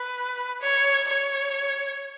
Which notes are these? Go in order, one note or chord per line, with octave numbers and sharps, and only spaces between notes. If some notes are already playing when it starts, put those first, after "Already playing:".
Already playing: B4
C#5
C#5